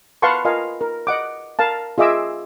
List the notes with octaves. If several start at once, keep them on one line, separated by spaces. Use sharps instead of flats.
B4 F5 F#5 A5 C6 C#6
F4 A#4 D#5 F5 G#5 C6
A#4
D#5 F#5 D6
A#4 F5 A5
F4 G#4 D#5 E5 D6 E6